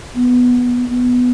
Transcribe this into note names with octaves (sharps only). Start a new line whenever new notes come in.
B3
B3